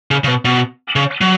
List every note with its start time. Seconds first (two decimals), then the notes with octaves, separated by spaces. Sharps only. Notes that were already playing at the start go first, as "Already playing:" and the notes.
0.11 C#3
0.24 C#3
0.28 B2
0.45 B2
0.96 C#3
1.21 F#3